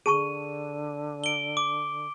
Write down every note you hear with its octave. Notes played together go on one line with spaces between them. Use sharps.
D3 G#4 A5 C#6 D#7
D7 G7
D6